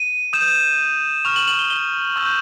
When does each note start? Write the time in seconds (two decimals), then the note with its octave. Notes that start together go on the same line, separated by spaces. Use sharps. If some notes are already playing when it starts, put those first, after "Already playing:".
Already playing: D#7
0.33 D#6 G6 E7
1.25 C#6 F6 F7
1.36 F#7
1.48 F#7
1.59 G7
1.70 G7
2.16 C#6 E6 G6